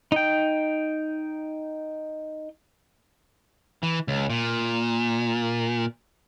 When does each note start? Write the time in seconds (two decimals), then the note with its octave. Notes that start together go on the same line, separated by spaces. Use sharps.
0.12 D#4 G5
3.83 E3
4.08 C#2
4.30 A#2